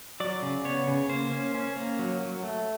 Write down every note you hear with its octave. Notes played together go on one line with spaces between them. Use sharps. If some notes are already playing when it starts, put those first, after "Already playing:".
F#3 D5
C#3
B3 C#5
C#3
A#3 C5
C#4
C#4
A#3
F#3
F#3
A3